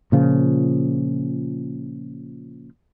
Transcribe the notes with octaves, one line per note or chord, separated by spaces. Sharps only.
A#2 C#3 F3